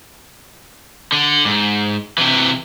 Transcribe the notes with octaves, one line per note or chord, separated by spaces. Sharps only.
D3
G#2
C3 E3